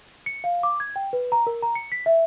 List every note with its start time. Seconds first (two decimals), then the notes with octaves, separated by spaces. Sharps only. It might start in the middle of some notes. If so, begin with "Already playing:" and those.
0.26 C#7
0.44 F5
0.63 D6
0.80 G#6
0.96 G5
1.13 B4
1.32 A#5
1.47 A#4
1.63 A#5
1.75 C#7
1.92 B6
2.06 E5